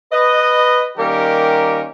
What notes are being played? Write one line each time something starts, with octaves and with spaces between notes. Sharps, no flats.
B4 D#5
D#3 G3 A#3 C#4 G4 A#4